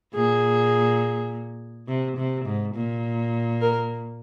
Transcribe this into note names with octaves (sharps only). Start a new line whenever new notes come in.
A#2 G#4
C3
C3
G#2
A#2
A#4